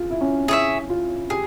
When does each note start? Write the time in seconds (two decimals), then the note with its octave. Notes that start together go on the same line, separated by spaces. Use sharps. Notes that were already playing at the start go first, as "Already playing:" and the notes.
Already playing: F4 G#4
0.10 E4
0.21 C#4
0.48 E4 G#4 C#5 E5
0.90 F4
1.30 G4 G#4